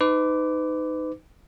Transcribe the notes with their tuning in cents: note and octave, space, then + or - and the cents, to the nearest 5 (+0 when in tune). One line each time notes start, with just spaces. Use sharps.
D#4 +0 B4 +35 D6 -10